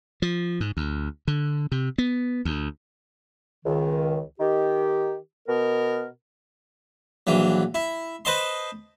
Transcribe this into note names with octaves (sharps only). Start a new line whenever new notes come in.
F3
G#2
D2
D3
C3
B3
D2
C#2 D#3
D#3 G4
B2 B3 A#4
A#1 E3 F#3
E4
B4 C5 D#5 A5 C6